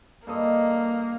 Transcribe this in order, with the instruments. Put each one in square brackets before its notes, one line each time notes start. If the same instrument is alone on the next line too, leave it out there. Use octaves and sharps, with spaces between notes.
[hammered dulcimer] G2 A4 D#5 [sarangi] A#3